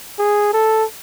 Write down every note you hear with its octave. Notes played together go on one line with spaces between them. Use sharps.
G#4
A4